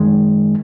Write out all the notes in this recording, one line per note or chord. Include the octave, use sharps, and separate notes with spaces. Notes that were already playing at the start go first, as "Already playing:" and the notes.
Already playing: F#2 D#3 G#3